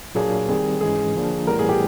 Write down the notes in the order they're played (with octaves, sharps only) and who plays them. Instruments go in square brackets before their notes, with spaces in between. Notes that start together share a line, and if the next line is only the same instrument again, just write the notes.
[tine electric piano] A#2 F#3 A#3 D4 [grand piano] G#4
[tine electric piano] D#3 G3 C4 [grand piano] G#4
[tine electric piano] G#2 E3 G#3 C#4 [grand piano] G#4
[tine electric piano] D3 F3 A#3 D4
[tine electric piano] A2 E3 G3 B3 [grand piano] A#4
[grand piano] G#4
G4